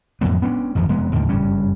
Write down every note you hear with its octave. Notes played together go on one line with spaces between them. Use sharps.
F2 A2 F#3 B3
B3 C#4 D4
A1 F2 D#3 F3
F1 G#3 B3
D#2 A2 D3 D#3
F#1 G2 G3 C#4